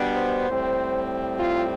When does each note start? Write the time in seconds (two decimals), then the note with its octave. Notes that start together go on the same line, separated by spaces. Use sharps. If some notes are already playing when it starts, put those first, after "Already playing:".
Already playing: B2 G3 B3 D4
0.17 C5
0.48 A2 G3 C4
1.39 F4